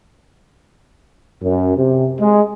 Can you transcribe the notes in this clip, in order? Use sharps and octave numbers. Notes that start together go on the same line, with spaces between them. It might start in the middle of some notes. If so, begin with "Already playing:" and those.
F#2
C3
G#3